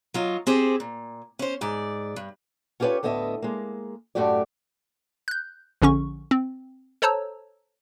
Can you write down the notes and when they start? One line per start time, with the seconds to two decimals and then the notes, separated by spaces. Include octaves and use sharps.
0.14 F#3 F4 D#5
0.47 C4 G4 G#4 C5
0.80 A#2
1.39 C#4 C5
1.61 G#2 D5
2.16 G2
2.80 C#4 F4 G4 G#4 B4 C#5
3.03 D2 A2 B3 D#5 E5
3.42 G#3 A#3
4.15 F#2 A2 A3 F#4 G4 D5
5.28 F#6 G6
5.82 A#1 D3 C#4 C#6
6.31 C4
7.02 A4 C5 C#5 A5 A#5 E6